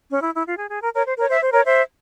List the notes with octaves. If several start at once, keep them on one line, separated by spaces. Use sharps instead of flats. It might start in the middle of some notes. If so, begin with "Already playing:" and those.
C#4
E4
E4
F4
G#4
G#4
A#4
A#4 C#5
C5
A#4 C#5
C5 E5
C5
A#4 C#5
C5 E5